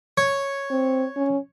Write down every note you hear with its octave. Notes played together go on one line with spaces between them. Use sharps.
C#5
C4
C#4